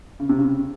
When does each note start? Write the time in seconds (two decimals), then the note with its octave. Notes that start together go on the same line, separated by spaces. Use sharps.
0.20 C#3
0.29 C3
0.38 C#3